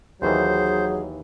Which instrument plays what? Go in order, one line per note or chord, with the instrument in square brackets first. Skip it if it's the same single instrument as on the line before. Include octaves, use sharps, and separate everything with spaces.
[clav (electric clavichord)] D#2 D#3 E3 [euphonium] F#3 [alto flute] G#4 [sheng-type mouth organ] C5